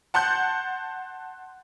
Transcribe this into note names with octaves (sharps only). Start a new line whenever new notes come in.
F#5 A5 C6 F#6 G6